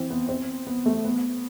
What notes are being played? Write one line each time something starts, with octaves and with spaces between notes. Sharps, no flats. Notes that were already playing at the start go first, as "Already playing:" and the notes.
Already playing: E3 C4
B3
C4
B3
A3
B3